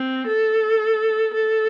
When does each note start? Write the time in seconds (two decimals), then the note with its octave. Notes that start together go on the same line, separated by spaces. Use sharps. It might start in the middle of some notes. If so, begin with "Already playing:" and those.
Already playing: C4
0.27 A4
1.34 A4